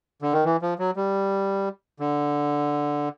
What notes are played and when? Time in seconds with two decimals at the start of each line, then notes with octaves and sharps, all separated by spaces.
0.22 D3
0.33 D#3
0.45 E3
0.62 F3
0.79 F#3
0.96 G3
2.00 D3